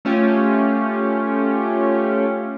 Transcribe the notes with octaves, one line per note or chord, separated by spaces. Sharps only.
A3 C#4 F4 G4